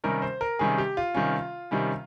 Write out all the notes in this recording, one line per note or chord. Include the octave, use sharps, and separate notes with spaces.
C3 D#3 G3 C#4 A#4
C5
A#4
C3 D#3 G3 C#4 G#4
G4
F4
C3 D#3 G3 C#4
C3 D#3 G3 C#4